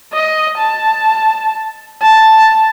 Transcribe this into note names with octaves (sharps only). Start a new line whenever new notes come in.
D#5
A5
A5